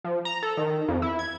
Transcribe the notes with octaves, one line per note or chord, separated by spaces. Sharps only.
F3
A#5
A4
D#3
F2
E4
G#6